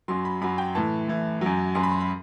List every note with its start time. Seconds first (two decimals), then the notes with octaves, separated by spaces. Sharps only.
0.08 F#2 F#3 C6
0.25 B5
0.41 F#2 F#3 B5
0.58 G5
0.75 A2 E3 A5
1.08 A2 E3
1.41 F#2 F#3
1.75 F#2 F#3 C6
1.83 B5
1.92 C6
2.00 B5